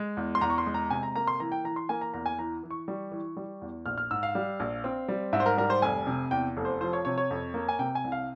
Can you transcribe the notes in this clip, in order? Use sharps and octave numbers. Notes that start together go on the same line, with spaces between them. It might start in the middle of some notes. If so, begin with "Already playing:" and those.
Already playing: G#3
E2
C6
E2 A#5
C#6
C6
G#3
A#5
C3 G#5
A#5
A#3 A#5
C6
E3 A#5
G5
E3 A#5
C6
A#3 G#5
A#5
E2 A#5
G#5
E3 A#5
E3
C#6
G3
E3
G3
E2
A#1 F6
F6
G#2 E6
F5
G3
A#1
C4
G3
G#2 E5
C5
A#4
G3 A#4
C5
F1 G#5
C3
E2 G5
F1
C5
F3 C5
C#5
C3 C#5
C#5
F2
A#3
G#5
C3 G5
G#5
C2
F5